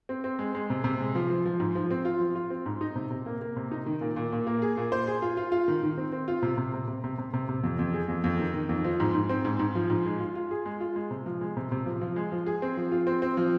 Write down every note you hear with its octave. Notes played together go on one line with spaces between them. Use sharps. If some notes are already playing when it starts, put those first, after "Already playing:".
C4
C4
G#3
G#3
C3
C3
G#3
F3
F3
F3
G#2
F3
C4
F4
F3
F4
C4
G#2
D#4
C3
C3
A#3
A#3
C3
D#4
D#3
A#2
A#2
A#2
A#3
G#4
A#2
C5
G#4
F4
F4
F4
D#3
D#3
C4
C4
F4
C3
C3
C3
C3
C3
C3
C3
C3
F2
F2
G#4
F2
F2
D#3
D#3
F2
F3
G#2
G#2
C4
G#2
G#2
F3
G#2
G#3
F4
F4
G#4
G#3
F4
G#3
C3
F3
G#3
C3
C3
F3
F3
G#3
F3
G#4
C4
F3
F4
C4
C4
F3